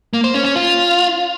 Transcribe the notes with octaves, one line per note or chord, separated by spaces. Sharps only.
A#3
C5
C#4
C#4
F4